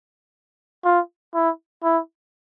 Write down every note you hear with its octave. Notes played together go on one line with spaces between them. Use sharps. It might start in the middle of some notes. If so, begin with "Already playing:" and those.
F4
E4
E4